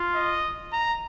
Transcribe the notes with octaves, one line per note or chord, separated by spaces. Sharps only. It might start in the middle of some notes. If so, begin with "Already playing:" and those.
Already playing: F4
D#5
A#5